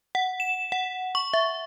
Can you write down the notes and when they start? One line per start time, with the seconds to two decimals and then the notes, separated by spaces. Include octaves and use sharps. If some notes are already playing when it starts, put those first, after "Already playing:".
0.15 F#5
0.40 E7
0.72 F#5
1.15 C#6
1.34 E5